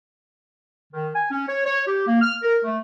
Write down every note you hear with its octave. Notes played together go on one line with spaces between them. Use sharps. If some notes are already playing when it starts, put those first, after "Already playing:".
D#3
G#5
C#4
C#5
C#5
G4
A#3
F6
A#4
A3